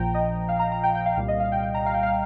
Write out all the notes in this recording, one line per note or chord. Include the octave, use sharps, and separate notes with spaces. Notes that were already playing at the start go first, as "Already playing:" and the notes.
Already playing: A#1 A#2 F3 G5 A#5
D#5
F5
A#5
A#5
G5
G5
F5
C2 A#2 G3 F5
D#5
F5
G5
G5
A#5
F5
G5
F5